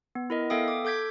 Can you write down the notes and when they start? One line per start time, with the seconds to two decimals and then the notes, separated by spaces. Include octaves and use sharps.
0.15 B3
0.30 E4 A#4 D#5
0.50 B3 A4 E5 F5 G5 D#6
0.68 D6
0.85 A4 D6 G6 G#6 B6